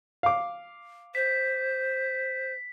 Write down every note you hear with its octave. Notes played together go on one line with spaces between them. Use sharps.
F5 D6
C5 B6